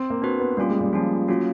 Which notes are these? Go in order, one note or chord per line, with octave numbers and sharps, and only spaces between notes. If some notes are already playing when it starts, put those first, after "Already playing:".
Already playing: C4
A#3
C4 D4 F#4 B4
B3
G3 A#3 C#4 F4
G#3
G3
F3 A#3 C#4 F4
F#3 A#3 C#4 F4